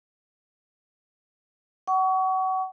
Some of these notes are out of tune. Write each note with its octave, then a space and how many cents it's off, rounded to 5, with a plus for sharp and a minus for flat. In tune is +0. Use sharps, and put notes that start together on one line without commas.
F#5 +30 C#6 +30